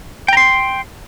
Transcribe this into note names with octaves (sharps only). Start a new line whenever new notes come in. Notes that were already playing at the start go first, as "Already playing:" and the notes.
G5 A#5 C6